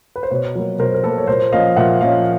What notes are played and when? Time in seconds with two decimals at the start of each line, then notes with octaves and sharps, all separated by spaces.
0.16 B4
0.23 C5
0.31 B2 B4 C#5
0.55 F#3 A#3
0.79 B2 A#4 C5
0.95 A#4
1.03 F#3 A#3 A4 B4
1.18 C#5
1.27 A#2 A#4 C5
1.52 F3 A#3 C#4 D#5 F5
1.76 A#2 E5 F#5
2.01 F3 A#3 C#4 D#5 F5